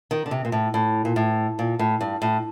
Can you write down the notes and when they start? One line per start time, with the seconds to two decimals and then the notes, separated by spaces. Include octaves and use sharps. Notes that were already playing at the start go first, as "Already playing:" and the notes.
0.11 D#3
0.26 D3
0.31 C3
0.45 A#2
0.52 A2
0.74 A2
1.05 A#2
1.16 A2
1.59 A#2
1.79 A2
2.01 G2
2.22 A2